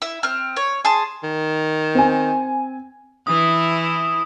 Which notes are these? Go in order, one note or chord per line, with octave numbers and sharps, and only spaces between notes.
E4
C4 F6
C#5
G#4 A5 C6
D#3
C4 G#5
E3 E4 D#6